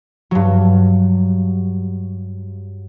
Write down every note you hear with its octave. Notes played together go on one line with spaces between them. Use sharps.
G2 F#3